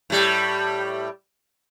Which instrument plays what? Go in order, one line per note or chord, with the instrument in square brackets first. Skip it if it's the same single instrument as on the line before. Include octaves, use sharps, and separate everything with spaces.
[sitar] A2 G3